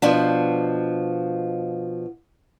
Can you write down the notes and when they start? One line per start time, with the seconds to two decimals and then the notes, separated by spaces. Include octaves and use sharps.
0.02 B2 F3 D4